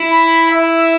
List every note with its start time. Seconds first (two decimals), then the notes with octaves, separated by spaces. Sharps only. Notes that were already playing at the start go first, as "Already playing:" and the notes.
Already playing: E4
0.10 B5
0.51 E5